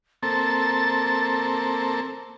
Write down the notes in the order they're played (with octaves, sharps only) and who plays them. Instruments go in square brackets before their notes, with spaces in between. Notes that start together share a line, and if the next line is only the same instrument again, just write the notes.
[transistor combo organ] A#3 C4 A4 [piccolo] A6